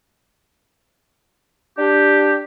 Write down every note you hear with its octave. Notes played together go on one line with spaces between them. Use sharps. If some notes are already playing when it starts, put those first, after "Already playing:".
D4 G4